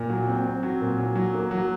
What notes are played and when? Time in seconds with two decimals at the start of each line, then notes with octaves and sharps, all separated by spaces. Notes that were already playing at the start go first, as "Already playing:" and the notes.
Already playing: A#2
0.10 F#3
0.28 C4
0.46 C4
0.63 F#3
0.81 A#2
0.99 F#3
1.15 F#3
1.34 A#3
1.51 F#3